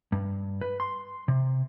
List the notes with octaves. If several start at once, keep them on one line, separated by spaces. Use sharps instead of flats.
G2
B4
C6
C3